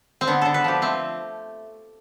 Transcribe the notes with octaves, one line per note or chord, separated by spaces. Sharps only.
C4
D3 B3
D3 A4
B4
F3 G4
A3 C4